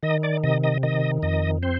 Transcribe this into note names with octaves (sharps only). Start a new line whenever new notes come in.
D#3 D#5
D5
C3 D#5
D#5
D#3 D#5
F2 D#5
C4 C5